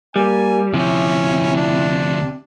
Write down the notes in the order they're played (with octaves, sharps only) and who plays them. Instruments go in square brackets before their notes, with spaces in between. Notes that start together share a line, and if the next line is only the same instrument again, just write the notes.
[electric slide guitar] G3 [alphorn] A#3 [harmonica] G#5
[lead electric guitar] D2 F3 [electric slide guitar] C3 [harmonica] C#4 [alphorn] E4
[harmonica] D4